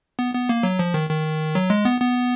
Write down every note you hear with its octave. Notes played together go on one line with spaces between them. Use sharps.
B3
B3
A#3
F#3
F3
D#3
D#3
F#3
G#3
B3
B3